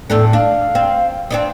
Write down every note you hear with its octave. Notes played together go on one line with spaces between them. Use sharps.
E2 A2 D4 A4
D4 F5
C4
C4 D4 D#4